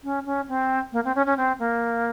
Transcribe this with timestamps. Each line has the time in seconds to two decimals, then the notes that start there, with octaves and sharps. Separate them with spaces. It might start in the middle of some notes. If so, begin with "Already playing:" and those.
0.04 C#4
0.26 C#4
0.48 C4
0.92 A#3
1.05 C4
1.15 C#4
1.26 C#4
1.37 C4
1.59 A#3